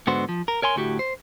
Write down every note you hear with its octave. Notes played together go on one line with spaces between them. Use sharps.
G#2 D3 B3 F#4 C5
F3
A#4
A#4 C#5 G#5 C6
D2 A2 F#4 G4
C5